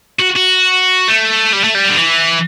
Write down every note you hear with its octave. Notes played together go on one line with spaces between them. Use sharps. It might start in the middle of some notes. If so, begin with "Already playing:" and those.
F#4
F#4
A3
G3
A3
G3
D3
E3